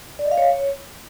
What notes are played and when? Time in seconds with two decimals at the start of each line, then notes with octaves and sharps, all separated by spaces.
0.19 D5
0.25 D#5
0.31 F5
0.38 C#5